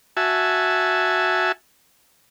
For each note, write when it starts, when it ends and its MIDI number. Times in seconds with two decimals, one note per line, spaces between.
0.17 1.52 66
0.17 1.52 76
0.17 1.52 80
0.17 1.52 81